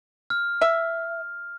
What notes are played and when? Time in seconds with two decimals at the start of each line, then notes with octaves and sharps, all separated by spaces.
0.30 F6
0.61 E5